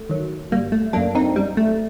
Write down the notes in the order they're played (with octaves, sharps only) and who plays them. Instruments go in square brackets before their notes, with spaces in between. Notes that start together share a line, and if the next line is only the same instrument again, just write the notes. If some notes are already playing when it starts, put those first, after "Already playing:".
Already playing: [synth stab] A3
D#3 F#3
G1 G3 A#3
A3
F#3 A#3 D4
F#2
C4 D#4
F#2 G3
A3